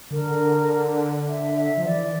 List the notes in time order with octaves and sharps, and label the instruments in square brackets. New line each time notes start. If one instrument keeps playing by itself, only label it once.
[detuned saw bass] D3 [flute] A#4
[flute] E5
E5
[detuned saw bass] F3
[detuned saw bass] E3 [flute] D5